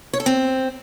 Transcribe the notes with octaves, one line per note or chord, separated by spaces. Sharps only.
C#5
A4
C4